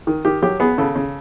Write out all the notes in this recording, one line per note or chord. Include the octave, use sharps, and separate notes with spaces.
D#3
D#3 G4
F#3 G4
B3 G#4
C#3 A4
C#3